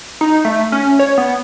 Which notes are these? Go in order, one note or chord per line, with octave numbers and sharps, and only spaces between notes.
D#4
A3
C#4
C#5
B3